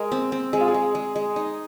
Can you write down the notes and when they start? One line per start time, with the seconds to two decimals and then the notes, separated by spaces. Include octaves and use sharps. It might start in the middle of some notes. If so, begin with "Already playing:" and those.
Already playing: G#3 A#4
0.12 C4
0.32 C4
0.53 G#3 G#4
0.61 F4
0.68 G#4
0.74 G#3
0.95 G#3
1.16 G#3
1.36 D#4